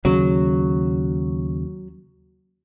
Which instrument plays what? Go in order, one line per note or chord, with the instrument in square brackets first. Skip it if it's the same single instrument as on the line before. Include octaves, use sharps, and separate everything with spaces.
[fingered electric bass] D#2 C#3 [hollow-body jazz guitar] F#3